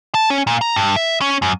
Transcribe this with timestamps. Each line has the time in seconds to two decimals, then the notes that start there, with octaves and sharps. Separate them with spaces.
0.15 A5
0.30 C#4
0.47 A#2
0.61 A#5
0.76 G2
0.96 E5
1.21 C#4
1.42 F#2